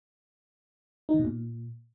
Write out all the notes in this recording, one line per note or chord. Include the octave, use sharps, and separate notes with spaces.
D#4
D#3
B2
A#2